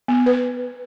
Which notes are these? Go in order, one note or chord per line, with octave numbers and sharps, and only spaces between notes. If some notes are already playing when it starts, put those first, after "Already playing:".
B3
B4